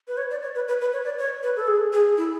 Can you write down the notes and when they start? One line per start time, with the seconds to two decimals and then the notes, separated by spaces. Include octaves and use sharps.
0.08 B4
0.17 C#5
0.31 D5
0.42 C#5
0.55 B4
0.68 B4
0.81 B4
0.93 C#5
1.05 D5
1.19 C#5
1.43 B4
1.56 A4
1.67 G#4
1.93 G#4
2.17 E4